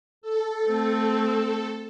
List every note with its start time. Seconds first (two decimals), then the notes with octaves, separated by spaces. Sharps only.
0.22 A4
0.66 A3 C4